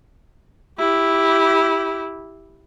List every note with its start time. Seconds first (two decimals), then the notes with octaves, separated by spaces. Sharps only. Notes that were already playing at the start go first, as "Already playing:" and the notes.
0.78 E4 G4